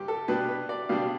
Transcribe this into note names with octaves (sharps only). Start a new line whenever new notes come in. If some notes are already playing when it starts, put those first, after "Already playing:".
Already playing: G2 G3 G4
A4
B2 G3 D4 B4
B4
D5
B2 G3 D4 F5